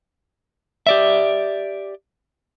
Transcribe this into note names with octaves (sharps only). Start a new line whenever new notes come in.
G4 D5 E5